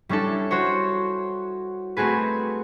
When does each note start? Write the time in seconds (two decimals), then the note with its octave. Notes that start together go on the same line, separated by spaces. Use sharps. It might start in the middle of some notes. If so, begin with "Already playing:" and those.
0.09 G3 C#4 D4 E4 A4
0.51 F#4 C5 C#5
1.97 A3 C4 F#4 G#4 B4